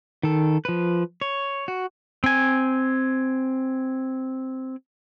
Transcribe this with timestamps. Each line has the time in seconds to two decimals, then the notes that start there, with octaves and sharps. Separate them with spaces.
0.23 D#3 A4
0.65 F3 B4
1.21 C#5
1.68 F#4
2.24 C4 G#5